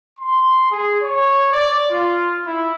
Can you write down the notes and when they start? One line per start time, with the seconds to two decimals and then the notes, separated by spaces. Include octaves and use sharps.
0.19 C6
0.70 G#4
1.02 C#5
1.53 D5
1.90 F4
2.46 E4